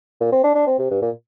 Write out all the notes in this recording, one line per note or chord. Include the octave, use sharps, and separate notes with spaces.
A#2
C4
D4
D4
C4
C3
G2
A#2